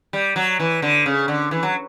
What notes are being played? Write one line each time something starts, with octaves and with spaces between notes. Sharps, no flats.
G3
F#3
E3
D3
C#3
D3
E3
F#3